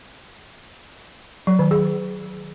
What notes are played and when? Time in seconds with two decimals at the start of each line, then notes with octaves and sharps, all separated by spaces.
1.47 F#3
1.59 D#3
1.71 G#4